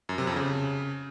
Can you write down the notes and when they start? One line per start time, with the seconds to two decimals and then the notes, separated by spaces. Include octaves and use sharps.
0.09 F#2
0.18 C3
0.27 F2
0.36 C#3